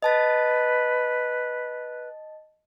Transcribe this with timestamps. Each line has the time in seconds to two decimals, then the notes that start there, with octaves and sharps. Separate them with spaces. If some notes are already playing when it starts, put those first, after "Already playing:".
0.02 B4 D#5 A5 A6